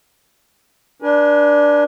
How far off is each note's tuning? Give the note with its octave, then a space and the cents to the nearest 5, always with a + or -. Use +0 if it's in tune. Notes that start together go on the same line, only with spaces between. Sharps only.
D4 +0 B4 -40 G#5 +0